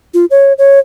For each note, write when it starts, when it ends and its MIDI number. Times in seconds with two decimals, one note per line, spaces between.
0.14 0.25 65
0.30 0.53 73
0.58 0.79 73